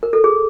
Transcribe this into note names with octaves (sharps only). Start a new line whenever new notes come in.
A#4
A4
G#4